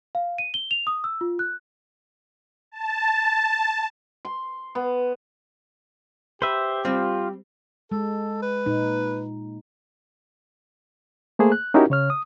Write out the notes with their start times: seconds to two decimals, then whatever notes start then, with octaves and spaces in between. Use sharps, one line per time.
0.15 F5
0.38 D#7
0.54 G7
0.71 F7
0.87 D#6
1.04 E6
1.21 F4
1.39 F#6
2.72 A5
4.25 C6
4.75 B3
6.42 G4 B4 C5 E5
6.85 G3 C4 F4
7.92 G#3 A4
8.42 B4
8.66 A#2 D#4
11.39 A3 A#3 G#4 C5
11.52 F#6
11.74 C#4 D#4 E4 F#4 G4 A#4
11.90 C#3 C#5 F6
12.10 D#6